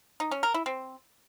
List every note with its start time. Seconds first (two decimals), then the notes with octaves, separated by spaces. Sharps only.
0.20 D#4
0.31 C#4
0.43 A#4
0.54 E4
0.66 C4